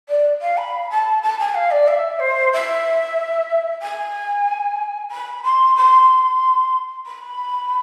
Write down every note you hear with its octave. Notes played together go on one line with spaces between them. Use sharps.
D5
F5
B5
A5
A5
G#5
F5
D5
E5
C5
E5
G#5
B5
C6
C6
B5